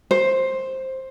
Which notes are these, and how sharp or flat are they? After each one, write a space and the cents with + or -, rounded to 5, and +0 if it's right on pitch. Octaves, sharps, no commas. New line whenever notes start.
C5 +10